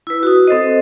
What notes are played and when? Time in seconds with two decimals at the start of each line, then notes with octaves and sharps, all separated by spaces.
0.07 E4 B4
0.23 F#4 D#6
0.47 C4 A4 C5 D#5